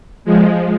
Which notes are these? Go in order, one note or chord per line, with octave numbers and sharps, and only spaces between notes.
F3 G#3